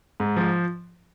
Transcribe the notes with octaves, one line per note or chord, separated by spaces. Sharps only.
G#2
F3